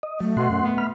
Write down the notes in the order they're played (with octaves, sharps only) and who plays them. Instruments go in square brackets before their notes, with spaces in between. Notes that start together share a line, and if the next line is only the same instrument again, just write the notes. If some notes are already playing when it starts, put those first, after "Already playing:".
[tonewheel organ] D#5
[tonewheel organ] F#3 [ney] A3
[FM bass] B2 [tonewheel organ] F#5 C6
[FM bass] F#2
B3
[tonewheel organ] B5 F6